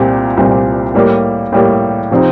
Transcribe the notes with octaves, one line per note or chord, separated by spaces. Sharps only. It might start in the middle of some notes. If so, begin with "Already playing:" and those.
Already playing: C2 A#2 G3 C4 G4
C2 A#2 G3 C4 G4
A2 G3 A#3
A2 G3 A#3
C3 F3 C4 D#4